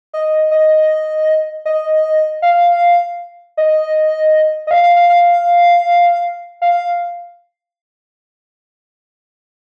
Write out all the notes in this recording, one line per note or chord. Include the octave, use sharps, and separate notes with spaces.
D#5
D#5
D#5
F5
D#5
D#5
F5
F5
F5
F5
F5